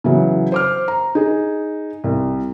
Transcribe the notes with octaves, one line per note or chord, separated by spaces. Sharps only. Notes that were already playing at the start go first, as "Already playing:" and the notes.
C#3 E3 F#3
C5 D6 F6
A#5
D#4 G#4
C2